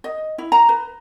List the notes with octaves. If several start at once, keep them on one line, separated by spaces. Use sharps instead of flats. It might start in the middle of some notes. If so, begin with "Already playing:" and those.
D#5
E4
A#5
B4